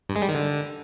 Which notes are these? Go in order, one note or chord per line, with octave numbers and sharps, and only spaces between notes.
G2
G#3
G3
D#3
D3